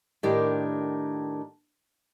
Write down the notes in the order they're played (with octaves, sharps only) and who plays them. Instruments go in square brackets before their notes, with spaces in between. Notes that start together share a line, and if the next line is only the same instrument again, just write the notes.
[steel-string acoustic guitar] A2 D#3 D4 G4 A#4